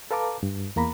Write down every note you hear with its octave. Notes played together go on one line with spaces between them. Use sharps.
A4 B4 F5 A5 A#5 D6
G2
E2 A#3 A#5 B5